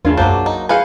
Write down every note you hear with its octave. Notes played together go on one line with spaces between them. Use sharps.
E2 C#3 A3 D4 F4
B1 F#2 F#3 A#3 D4 C5
D#4
G#4 B4 C5 F5 G#5 C#7